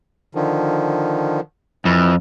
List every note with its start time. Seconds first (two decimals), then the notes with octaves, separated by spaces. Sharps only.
0.35 D3 D#3 F3
1.85 F2 E3